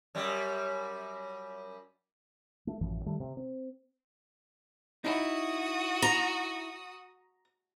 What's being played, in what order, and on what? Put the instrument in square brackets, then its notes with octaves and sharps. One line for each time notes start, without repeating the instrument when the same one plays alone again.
[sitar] F#2 G3
[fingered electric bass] A3
A1 F#2 E3 F3
D#3 G3 A3
C3
C4
[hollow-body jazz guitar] D#4 E4 [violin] F#4 D#6
[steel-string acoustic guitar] A#5